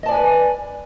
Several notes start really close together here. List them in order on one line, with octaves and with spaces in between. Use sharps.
D#5 A5 D5 G#5 B4